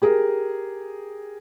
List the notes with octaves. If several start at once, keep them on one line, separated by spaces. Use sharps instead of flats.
G4 G#4 A#4